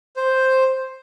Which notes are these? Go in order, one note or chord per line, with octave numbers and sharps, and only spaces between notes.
C5